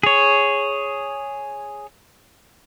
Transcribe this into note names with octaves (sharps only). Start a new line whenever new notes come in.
G#4 C#5